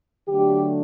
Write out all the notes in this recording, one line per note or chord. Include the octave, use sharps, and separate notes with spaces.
D3 F#3 A3 D4 G4